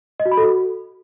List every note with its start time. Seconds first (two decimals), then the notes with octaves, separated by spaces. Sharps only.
0.20 D#5
0.26 F#4
0.31 B5
0.37 A4
0.43 F#4